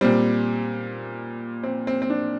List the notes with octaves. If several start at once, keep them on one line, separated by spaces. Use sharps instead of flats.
A#2 G3 C4
C4
C4
C4
D4